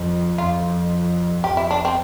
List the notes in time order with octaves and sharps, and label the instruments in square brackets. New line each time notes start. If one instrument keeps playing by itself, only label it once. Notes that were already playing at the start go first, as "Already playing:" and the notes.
Already playing: [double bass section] F2
[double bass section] F2 [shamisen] F4
[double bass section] F2 [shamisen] G4
[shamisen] E4
D4
C4